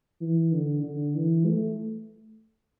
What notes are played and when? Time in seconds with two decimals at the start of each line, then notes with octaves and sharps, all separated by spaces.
0.21 E3
0.53 D3
0.84 D3
1.15 E3
1.46 A3